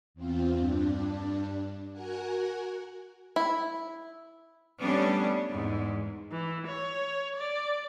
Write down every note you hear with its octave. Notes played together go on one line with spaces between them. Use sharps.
E2 C4 F4
G2 D4
F#4 A#4 F#5 G#5
E4
G3 A3 B3 C#4 D4
E2 G#2
E3
C#5
D5